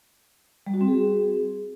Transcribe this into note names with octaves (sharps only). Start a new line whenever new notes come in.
G3
F#4
C4
G#4